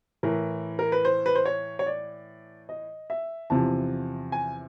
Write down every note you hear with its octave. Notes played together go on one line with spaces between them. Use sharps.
A2 E3 A#4
A#4
B4
C5
B4
C5
C#5
C#5
D5
D#5
E5
E2 C3 F3 A5
G#5